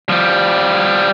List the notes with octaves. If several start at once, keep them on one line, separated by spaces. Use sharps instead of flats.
F3 G3